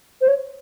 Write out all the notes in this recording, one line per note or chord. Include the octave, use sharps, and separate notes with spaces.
C5
C#5